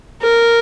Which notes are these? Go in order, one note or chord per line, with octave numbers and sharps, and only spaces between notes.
A#4